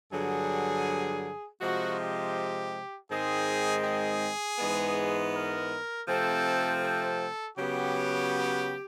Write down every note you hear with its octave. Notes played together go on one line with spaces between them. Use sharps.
G2 D3 F#3 G#4
C3 F3 G#3 F#4
G4
G#2 D#3 G#3 C4 G#4
G#4
G#2 E3 G#3 B3
A#4
C3 F3 A3 C4 A4
A4
C#3 F#3 B3 G4